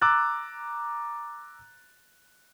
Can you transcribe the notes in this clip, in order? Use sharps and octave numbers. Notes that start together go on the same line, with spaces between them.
A#5 D6 E6 F#6 A6